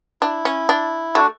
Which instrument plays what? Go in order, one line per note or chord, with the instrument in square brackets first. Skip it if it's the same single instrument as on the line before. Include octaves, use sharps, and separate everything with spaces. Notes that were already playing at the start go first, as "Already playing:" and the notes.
[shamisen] D4 [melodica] E4
[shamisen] C#4
D4
[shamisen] A3 [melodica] D4 F#4